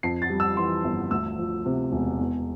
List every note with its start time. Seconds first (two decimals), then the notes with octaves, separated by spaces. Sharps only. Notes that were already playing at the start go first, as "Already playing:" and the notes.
0.03 F2 C7
0.22 A6
0.30 G3
0.40 E6
0.57 E3 C6
0.84 G1
1.11 D2 E6
1.38 F3
1.66 C3
1.92 E1
2.19 E2